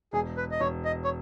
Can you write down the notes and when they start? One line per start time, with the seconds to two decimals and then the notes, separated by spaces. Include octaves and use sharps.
0.13 E1 G#4
0.37 B4
0.51 D#5
0.60 E1 C#5
0.85 D#5
1.04 C#5